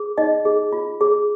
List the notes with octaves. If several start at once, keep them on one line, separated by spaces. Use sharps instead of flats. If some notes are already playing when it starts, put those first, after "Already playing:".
Already playing: G#4
D#4 D#5
G#4
F4
G#4